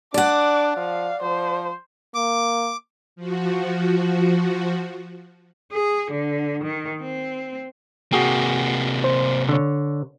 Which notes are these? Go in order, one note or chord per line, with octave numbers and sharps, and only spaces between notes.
D4 D5 F#5 D6
F3 F5
F3 C5
A#3 D6
F3 F#4
G#4
D3
D#3
C4
C3 A#3 F#4 G#4 G5
C5
D3 C#5